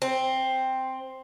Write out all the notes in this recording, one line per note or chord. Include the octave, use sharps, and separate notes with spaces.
C4